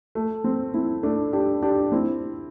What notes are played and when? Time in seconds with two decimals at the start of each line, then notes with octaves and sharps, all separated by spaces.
0.15 A3
0.44 C4
0.74 C4 E4
1.03 A3 D4
1.33 D4 G4
1.62 D4 G4
1.92 C4 E4